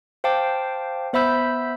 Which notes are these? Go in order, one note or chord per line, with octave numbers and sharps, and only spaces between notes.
C5 F5 G5 A5 D6
B3 C5 E5 B5 E6 G6